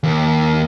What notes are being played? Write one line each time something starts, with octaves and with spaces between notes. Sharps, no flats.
D#2